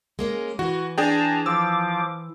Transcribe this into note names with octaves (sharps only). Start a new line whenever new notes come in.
G#3 A#3 C#4
E3 F#4
D4 G#4 G5 A5 A#5
F3 D6 E6